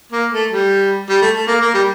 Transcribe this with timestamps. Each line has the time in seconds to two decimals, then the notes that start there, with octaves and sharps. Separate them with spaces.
0.12 A#3
0.32 A3
0.51 G3
1.09 G3
1.22 A3
1.35 A3
1.47 A#3
1.61 A#3
1.74 G3